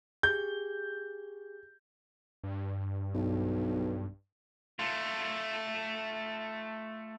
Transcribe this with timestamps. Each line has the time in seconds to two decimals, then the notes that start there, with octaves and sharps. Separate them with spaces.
0.23 G4 G#4 G6
2.44 G2
3.14 B1
4.79 A3 F4